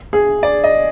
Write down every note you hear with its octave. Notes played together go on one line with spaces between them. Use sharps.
G#4
D5
D#5